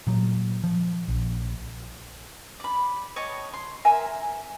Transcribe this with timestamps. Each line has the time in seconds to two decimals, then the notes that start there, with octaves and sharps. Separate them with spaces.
0.07 A#2 F#3
0.64 F3
1.08 A#1
2.60 D5 B5
3.16 C#5 D#5 G5 A5
3.54 C6
3.85 A#4 E5 G#5